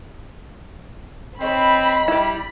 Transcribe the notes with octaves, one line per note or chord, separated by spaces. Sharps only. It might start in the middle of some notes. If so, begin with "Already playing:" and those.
G#3 C4 D#4 C#5 B5
G3 E4 G4